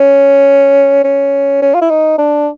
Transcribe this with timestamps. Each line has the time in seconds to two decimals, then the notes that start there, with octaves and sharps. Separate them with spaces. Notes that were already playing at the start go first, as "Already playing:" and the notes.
Already playing: C#4
1.04 C#4
1.62 C#4
1.74 F4
1.82 E4
1.91 D#4
2.18 D4